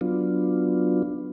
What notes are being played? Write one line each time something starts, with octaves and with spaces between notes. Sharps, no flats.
F#3 B3 D4 F4